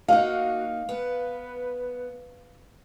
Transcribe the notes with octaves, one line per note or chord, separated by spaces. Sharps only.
A#3 D#4 F#4 F5
B3 B4